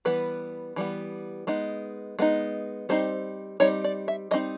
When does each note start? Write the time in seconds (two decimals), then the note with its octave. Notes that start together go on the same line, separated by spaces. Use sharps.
0.05 E3 G3 B3 B4
0.76 E3 G3 B3
1.47 G#3 B3 D#4
2.19 G#3 B3 D#4
2.89 G3 C4 D#4 C5
3.60 G3 C4 D#4 C#5
3.84 D5
4.08 E5
4.31 G3 C4 D#4 D#5